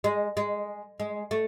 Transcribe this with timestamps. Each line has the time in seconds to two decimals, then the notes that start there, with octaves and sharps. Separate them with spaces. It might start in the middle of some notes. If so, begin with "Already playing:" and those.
0.04 G#3
0.37 G#3
1.00 G#3
1.31 A3